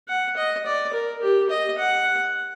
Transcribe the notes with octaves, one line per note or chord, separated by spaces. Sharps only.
F#5
D#5
D5
A#4
G4
D#5
F#5